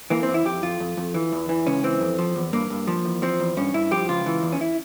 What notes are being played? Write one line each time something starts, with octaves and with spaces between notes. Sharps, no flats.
E3 A#3
C4
E2
E4
F2 G4
F2 F4
F2
F2
E3
E2
E3
C#2 C#4
E3 C4
F2
F3
E2
G2 A#3
G2
F3
E2
F3 C4
E2
G2 C#4
G2 E4
F3 G4
C#2 F4
E3
E2
C#4
E4